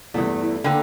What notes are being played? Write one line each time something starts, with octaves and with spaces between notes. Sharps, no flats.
E2 G2 E3 A3
E4
D3 A#3 B4 G5